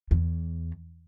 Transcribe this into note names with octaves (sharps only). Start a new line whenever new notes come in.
E2